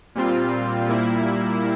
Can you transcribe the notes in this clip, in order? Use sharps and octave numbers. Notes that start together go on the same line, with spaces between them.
A#2 G3 C4 F4
A#2 G3 A#3 E4